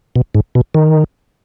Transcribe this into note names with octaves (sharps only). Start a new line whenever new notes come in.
B2
G#2
B2
D#3